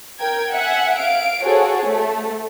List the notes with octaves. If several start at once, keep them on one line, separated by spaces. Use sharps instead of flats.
A#4 G5 G#6
E5 F#5 G#5
F5 D7
F#4 G#4 A4 C5 C#5
A3